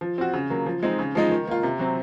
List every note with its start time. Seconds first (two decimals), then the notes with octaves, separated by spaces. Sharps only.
0.01 F3
0.18 C4 F#4
0.33 C#3
0.50 F#3 A#3
0.66 F3
0.83 G#3 C4 D#4
0.99 C#3
1.15 F3 G#3 D#4
1.31 D#3
1.48 A#3 F4
1.63 C3
1.79 F#3 C4